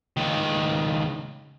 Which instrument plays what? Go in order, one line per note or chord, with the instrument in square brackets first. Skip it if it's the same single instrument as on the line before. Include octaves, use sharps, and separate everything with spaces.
[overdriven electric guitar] C#2 D#3